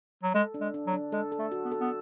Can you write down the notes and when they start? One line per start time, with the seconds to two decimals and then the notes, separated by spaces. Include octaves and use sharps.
0.23 F#3
0.35 G#3 A4
0.54 D4
0.61 G#3
0.74 D4
0.87 F#3
0.93 D4
1.12 G#3 A4
1.32 A4
1.39 A3
1.52 F#4
1.65 B3
1.72 A4
1.80 B3